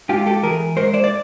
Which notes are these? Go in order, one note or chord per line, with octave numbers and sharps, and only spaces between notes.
G#2 F4 G4
G4 A4
E3 G#4 A#4
G#2 A#4 C5
C5 D5
D5